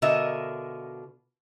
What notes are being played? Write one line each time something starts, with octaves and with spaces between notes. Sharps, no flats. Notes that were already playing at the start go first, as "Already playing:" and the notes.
B2 D3 F4 A#4 D#5 E5